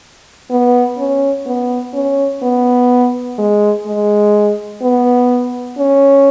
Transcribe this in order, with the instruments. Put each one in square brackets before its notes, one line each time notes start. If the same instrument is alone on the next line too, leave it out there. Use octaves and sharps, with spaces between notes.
[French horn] B3
C#4
B3
C#4
B3
G#3
G#3
B3
C#4